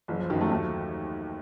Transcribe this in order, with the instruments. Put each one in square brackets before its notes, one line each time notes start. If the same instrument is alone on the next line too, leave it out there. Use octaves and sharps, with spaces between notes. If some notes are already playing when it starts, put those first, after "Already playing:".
[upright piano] F#1 [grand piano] E3
[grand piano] F3
[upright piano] F#2 D#3 [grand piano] F#3
[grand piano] A3
[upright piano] D#2 [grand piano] A3